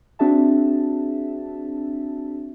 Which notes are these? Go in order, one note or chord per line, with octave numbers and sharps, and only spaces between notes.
C4 D4 F#4 G#4 E5 A5